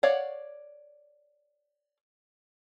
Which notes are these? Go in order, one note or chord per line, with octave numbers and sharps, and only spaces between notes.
C#5 D5 F5 F#5